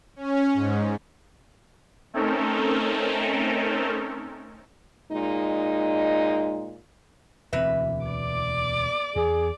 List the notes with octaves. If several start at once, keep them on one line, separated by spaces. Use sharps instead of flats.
C#4
G#2
A3 C4 C#4 D#4 A4 A#4
A#2 G#3 D#4
E1 D2 E3 C4 B4 E5
D5 D6
E2 G#4